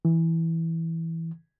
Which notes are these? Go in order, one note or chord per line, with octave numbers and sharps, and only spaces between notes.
E3